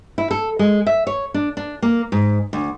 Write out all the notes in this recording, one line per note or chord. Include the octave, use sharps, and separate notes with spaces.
E4
A4
G#3
E5
C#5
D4
D4
A#3
G#2
D2